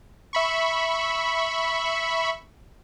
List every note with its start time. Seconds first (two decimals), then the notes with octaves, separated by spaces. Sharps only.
0.33 E5 B5 C#6